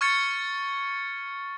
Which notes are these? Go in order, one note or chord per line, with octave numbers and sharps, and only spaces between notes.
C#6 F6 G#6 A6 C#7